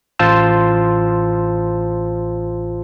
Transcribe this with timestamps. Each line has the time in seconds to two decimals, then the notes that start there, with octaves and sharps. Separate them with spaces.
0.19 A1 F4 C5 A5 E6